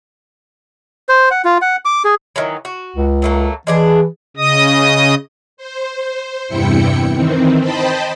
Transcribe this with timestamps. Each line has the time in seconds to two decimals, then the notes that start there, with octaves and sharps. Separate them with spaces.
1.09 C5
1.31 F#5
1.45 F4
1.62 F#5
1.85 D6
2.04 G#4
2.36 D#3 E3 F#3
2.65 F#4
2.96 C#2
3.22 F#3 A3 A#3
3.67 E3 G#3 D4 G#4
4.37 C#3 D#5 D#6
5.57 C5
6.48 E2 G2 C3 E4 G5 C#7
7.13 D#3 E3 C4
7.60 C5 D#5 G5 A5 B5